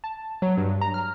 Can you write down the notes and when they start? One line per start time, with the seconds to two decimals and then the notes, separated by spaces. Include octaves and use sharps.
0.04 A5
0.42 F#3
0.57 G2
0.81 A#5
0.94 F6